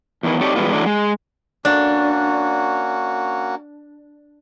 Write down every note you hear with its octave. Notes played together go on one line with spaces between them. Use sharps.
E2 D#3 E3
C4 D#4 G4 A4 C#5 D5
D3 E3 G3 G#3 B3 F4
E3 F#3 A3 D4
G#3
A#3 C#4 D4 F#4